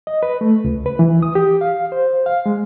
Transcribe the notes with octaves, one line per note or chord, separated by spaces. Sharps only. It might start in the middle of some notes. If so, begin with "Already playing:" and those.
D#5
B4
A3
C#2
B4
E3
D#6
G4
F5
C5
F5
G#3